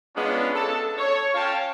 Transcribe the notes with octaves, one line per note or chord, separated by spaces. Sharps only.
G#3 B3 C#4 D4 F4
A4 A5
C#5
C#4 F4 F5 G5 A5